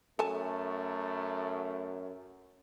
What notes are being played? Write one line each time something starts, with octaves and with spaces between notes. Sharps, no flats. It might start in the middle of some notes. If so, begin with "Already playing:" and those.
F#2 A3 A4 G#5 A5